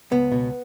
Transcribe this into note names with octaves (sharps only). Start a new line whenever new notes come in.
C#2 B3
B2